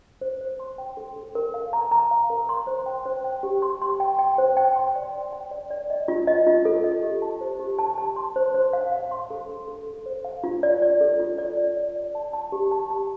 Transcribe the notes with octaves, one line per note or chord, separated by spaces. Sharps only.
C5
C5
C6
G5
A4
A4
A#4
F5
A#5
A#5
F5
A#4
C6
C5
G5
C5
G5
G4
C6
C6
G5
G5
C5
G5
C6
D5
G5
G5
D5
D5
D#5
F4
D#5
F4
A4
D#5
G4
A5
C5
G4
A5
A5
C6
C5
C5
F5
F5
C6
A4
A4
A4
A4
C5
F5
F4
D5
D5
A4
F4
D5
D5
D5
D5
A5
A5
G4
A5
A5